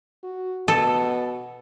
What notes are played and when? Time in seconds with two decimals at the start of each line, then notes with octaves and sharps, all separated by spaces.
0.23 F#4
0.68 B2 A4